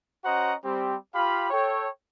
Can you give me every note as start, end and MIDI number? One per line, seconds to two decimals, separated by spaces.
0.25 0.53 61
0.25 0.53 66
0.25 0.53 72
0.25 0.53 75
0.25 0.53 78
0.25 0.53 82
0.64 0.95 55
0.64 0.95 60
0.64 0.95 67
1.15 1.50 65
1.15 1.50 67
1.15 1.50 77
1.15 1.50 83
1.51 1.88 69
1.51 1.88 73
1.51 1.88 79